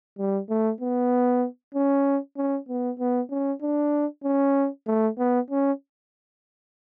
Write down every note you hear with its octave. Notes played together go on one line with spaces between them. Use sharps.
G3
A3
B3
C#4
C#4
B3
B3
C#4
D4
C#4
A3
B3
C#4